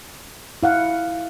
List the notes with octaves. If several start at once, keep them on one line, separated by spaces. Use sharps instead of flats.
E4 F5 F#5